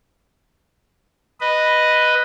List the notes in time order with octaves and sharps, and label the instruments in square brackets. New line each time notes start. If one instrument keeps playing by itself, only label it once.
[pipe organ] B4 D#5